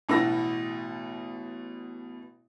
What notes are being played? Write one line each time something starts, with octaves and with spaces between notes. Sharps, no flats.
A1 B2 E4 F#4 E6 A#6